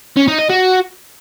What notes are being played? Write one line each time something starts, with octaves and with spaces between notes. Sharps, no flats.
C#4
D#4
D#5
F#4